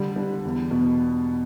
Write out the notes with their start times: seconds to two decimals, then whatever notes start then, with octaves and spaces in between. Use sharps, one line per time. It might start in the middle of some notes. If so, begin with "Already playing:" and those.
Already playing: D3 G3
0.16 D4
0.45 E2
0.71 B2